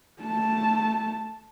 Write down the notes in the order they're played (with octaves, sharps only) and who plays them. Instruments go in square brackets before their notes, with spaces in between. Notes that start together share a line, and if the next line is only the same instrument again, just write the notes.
[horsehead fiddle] A3 A5